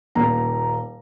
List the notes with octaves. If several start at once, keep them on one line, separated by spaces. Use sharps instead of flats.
D#1 A#2 A#5